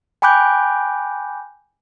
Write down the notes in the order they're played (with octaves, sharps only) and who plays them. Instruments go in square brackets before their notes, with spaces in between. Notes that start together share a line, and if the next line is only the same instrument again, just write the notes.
[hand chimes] G5 G#5 B5 D6 F#6 G6